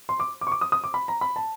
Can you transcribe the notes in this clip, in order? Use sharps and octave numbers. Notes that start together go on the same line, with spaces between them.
C6
D6
D6
C#6
D6
D#6
D#6
D6
B5
A#5
B5
A5